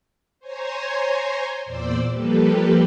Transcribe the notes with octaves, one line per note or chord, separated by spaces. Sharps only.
C5 C#5 G#5 A#5 C6
E2 A#2 C5 D5 D6 E6
F3 G3 A#3 G4 A4 B4